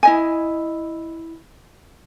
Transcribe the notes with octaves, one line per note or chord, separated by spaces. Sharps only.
E4 D#5 G#5